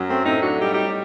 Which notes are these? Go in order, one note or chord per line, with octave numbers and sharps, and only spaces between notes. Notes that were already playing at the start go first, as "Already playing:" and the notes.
Already playing: F#2 F#3
A3 C4
A2 C4 D#4
D4 F#4
G3 D#4 G4
D#4 G4